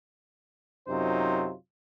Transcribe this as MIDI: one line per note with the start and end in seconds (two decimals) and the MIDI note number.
0.88 1.53 42
0.88 1.53 48
0.88 1.53 54
0.88 1.53 63
0.88 1.53 65
0.88 1.53 72